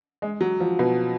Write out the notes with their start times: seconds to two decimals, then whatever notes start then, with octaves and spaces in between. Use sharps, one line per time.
0.22 G#3
0.41 F#3
0.60 F3
0.79 B2